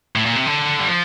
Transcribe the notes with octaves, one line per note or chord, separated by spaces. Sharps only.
A2
A#2
C3
D3
G3
F3